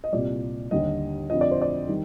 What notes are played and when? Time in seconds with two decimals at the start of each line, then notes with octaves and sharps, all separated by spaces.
0.04 D#5
0.12 C2 A#2 G3 D5
0.71 D#2 D3 G3 D#5
1.30 F2 D3 F3 D#5
1.41 D5
1.51 C5
1.62 D5
1.89 D#3 G3